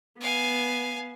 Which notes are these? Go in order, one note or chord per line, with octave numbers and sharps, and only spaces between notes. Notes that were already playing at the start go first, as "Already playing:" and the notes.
B3 F5 G#5